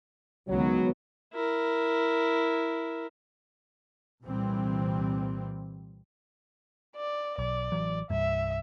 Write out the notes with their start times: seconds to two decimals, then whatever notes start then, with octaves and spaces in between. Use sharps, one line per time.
0.49 C#2 D#3 F#3 B3
1.34 E4 A#4
4.25 C2 A#2 E3 G3 C4
6.96 D5
7.38 B1 D5
7.72 A1 E3 F#3
8.10 C2 G2 E5